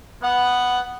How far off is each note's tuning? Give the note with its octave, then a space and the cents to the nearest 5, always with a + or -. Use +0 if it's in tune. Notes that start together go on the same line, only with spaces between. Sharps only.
B3 +0 F#5 +0